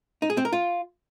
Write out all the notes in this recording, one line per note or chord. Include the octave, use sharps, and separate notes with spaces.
D#4
G#4
C4
A#4
F4